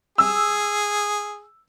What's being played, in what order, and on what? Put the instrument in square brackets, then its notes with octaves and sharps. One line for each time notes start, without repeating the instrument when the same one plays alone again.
[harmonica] G#4 [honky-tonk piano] E6